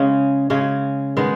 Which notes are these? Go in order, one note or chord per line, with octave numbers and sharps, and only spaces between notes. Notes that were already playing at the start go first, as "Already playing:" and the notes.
Already playing: C#3 G#3 C#4
C#3 G#3 C#4
D#3 G#3 B3